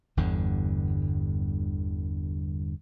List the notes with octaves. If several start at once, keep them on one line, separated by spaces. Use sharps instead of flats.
G1 E2 G2 D3